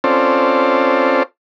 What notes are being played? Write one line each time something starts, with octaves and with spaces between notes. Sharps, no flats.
C4 C#4 F4 A4 C5 D5